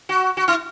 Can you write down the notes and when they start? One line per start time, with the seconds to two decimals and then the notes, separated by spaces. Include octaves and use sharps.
0.09 F#4
0.37 F#4
0.48 E4